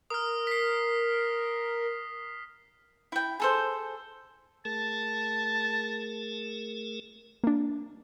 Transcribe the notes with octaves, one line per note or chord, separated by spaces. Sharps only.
A#4 D#6 F6
B6 C7
E4 G5
G#4 A4 C5
A3 G#4 A#4 A5
A#3 D4